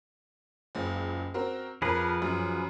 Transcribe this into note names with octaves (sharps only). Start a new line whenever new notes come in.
F#1 C#2
C4 F#4 A#4
F2 F3 G#4 A#4 B4
F#2